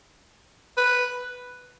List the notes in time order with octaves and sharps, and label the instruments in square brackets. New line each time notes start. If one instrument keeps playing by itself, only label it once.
[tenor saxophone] B4